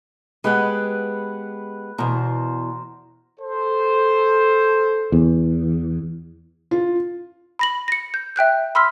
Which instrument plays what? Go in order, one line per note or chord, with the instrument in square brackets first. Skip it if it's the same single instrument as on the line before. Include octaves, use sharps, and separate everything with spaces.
[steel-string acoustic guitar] G#3 B3 G4 [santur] B4 F#5
[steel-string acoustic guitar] E2 B2 [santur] A#4 C5
[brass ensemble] A4 C5
[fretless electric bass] E2
[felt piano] F4
[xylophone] B5 A#6 F#7
A#6 C#7
G6
E5 G5 F#6 G6
B5 C6 E6 F6 B6